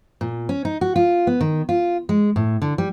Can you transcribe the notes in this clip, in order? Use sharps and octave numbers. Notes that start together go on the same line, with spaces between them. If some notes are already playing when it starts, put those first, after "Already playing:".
A#2
C#4
D#4
F#4
F4
B3
D#3
F4
G#3
A2
D3
G3